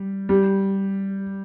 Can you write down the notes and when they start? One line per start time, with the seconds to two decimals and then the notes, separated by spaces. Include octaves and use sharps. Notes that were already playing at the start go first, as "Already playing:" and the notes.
Already playing: G3
0.29 G3